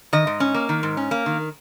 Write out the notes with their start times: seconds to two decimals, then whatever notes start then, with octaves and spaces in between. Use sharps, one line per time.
0.13 D#3 D#5
0.27 G#2
0.40 C#4
0.54 A#3
0.69 D#3
0.83 G#2
0.97 C#4
1.11 A#3
1.26 D#3